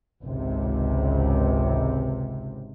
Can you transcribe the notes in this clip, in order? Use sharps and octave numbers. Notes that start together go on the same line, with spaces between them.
G#1 C#2 C3